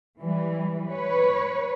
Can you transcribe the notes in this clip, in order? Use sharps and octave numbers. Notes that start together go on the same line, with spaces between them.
E3 G3
B4 C#5